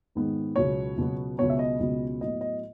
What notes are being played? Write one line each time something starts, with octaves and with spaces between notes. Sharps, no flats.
G#2 D#3 G#3 B3
C#2 B2 F#3 B3 C#5
C#2 B2 F#3 B3
C#2 B2 F#3 B3 C#5
E5
D#5
C#2 B2 F#3 B3
A2 F#3 B3 D#5
D#5